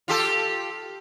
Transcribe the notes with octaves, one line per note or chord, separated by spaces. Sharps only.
F4 G4 A4